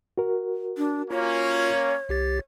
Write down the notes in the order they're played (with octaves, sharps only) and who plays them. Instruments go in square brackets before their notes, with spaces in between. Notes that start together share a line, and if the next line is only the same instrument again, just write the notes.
[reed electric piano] F#4 A#4
[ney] D4
[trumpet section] A#3 C#4 [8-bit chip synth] F4 [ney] C#5
[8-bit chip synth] C2 G4 A6